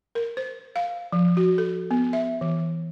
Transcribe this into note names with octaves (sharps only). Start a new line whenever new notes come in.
A#4
C5
F5
F3
F#4
A4
B3
E5
E3